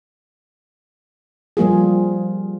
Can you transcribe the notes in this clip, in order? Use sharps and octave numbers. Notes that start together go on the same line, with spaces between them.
F3 G3 A#3 F4 G#4